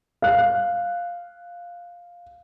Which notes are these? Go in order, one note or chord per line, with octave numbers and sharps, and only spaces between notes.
F5 F#6